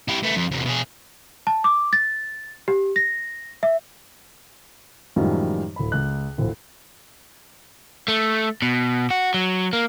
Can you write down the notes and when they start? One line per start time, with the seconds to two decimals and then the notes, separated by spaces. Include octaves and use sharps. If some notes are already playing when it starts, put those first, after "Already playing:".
0.08 E4 G4
0.23 A3 B3
0.36 F2
0.51 E2 C3
0.65 B2 G#4
1.47 A5
1.64 D6
1.93 A6
2.68 G4
2.96 A#6
3.63 E5
5.16 F#2 A2 D#3 F3 G3 G#3
5.76 D1 B5
5.92 C#2 F#6
6.38 D1 A#1
8.08 A3
8.62 B2
9.11 F#4
9.34 F#3
9.73 A#3